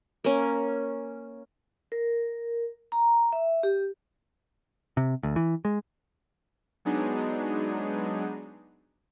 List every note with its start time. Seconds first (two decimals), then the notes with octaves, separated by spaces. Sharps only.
0.24 A#3 C#4
1.92 A#4
2.92 A#5
3.33 E5
3.63 G4
4.97 C3
5.23 D2
5.36 E3
5.65 G#3
6.85 F#3 G#3 B3 D4 D#4 G#4